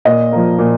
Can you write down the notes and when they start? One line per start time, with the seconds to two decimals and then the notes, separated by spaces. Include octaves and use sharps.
0.05 A#2 D#5
0.32 F3 A#3
0.59 A#2